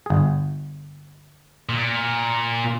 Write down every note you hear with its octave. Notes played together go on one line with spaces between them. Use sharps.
G1 G#4
A#2